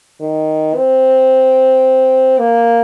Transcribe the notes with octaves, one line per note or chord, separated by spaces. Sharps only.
D#3
C4
A#3